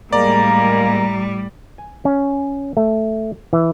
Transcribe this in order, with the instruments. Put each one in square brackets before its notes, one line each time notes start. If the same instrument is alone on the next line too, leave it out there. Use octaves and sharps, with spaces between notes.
[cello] A2 G3 [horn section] G#3 A#3 [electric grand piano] D5 [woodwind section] A#5
[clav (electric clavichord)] G#5
C#4
A3
E3